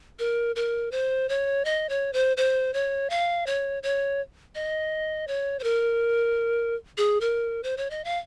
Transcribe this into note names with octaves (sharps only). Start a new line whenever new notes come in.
A#4
A#4
C5
C#5
D#5
C#5
C5
C5
C#5
F5
C#5
C#5
D#5
C#5
C5
A#4
G#4
A#4
C5
C#5
D#5
F5